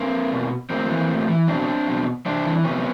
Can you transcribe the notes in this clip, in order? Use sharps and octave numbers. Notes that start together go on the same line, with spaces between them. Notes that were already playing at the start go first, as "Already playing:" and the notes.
Already playing: A#3 C4
B2
A2 A#3 C4
E3
A2
E3
B2 C4 D4
B2
C3 C4 D4
E3
C3 B3 C#4